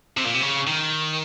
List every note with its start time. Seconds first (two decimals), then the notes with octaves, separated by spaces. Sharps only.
0.17 C3
0.25 A#2
0.34 C3
0.42 C#3
0.67 D#3